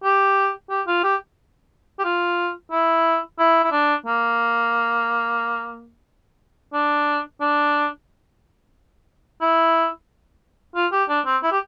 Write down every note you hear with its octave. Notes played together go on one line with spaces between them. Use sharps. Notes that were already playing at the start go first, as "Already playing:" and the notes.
G4
G4
F4
G4
G4
F4
E4
E4
E4
D4
A#3
D4
D4
E4
F4
G4
D4
C4
E4
G4